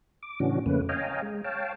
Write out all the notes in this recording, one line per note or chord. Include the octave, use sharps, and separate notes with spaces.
D6
A2 C#3 E3 C#4 D4 F#4
F2 C#3 A3 A#3 C#4 B4
C#5 D#5 F5 G5 G#5 A#5
G#3
C#5 F5 G5 A5